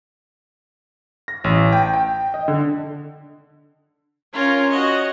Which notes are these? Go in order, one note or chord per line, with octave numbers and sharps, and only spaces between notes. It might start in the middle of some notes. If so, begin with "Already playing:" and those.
A#6
A1
G5
G5
D#5
D3
C#4 F4 A#4 C#5
F#4 C#5 D#5